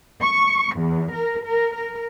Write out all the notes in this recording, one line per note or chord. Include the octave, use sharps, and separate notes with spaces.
C#6
E2
A#4
A#4
A#4